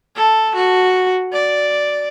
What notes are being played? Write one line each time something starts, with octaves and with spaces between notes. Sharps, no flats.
A4
F#4
D5